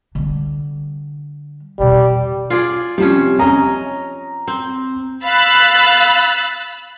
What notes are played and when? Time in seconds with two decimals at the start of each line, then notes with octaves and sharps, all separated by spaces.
0.15 D3 G3
1.79 E2 B2 G3
2.50 F4 G#4 D5
2.98 C3 F3 G3 C#4
3.39 C#4 D#5 A#5
4.48 C4
5.23 F5 B5 E6 F#6 A6